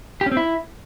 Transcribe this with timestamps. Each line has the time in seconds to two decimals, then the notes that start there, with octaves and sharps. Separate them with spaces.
0.21 G4
0.26 C#4
0.32 C4
0.37 E4